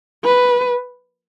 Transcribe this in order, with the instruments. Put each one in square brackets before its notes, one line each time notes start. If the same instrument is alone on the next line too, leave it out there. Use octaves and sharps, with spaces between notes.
[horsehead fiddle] B4